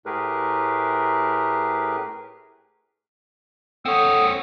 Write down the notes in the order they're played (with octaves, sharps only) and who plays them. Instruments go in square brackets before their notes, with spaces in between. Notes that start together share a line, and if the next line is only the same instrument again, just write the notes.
[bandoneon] A2 A3 G4 G#4 A#4 B4
[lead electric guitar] C4 C#5 [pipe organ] A4 F#5 D#6